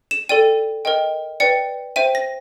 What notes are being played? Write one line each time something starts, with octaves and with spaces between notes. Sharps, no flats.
E7
A4 D5 G5 D#7
A#4 D#5 G5
B4 D5 G5 C#7
C5 E5 G5 D#7
A#6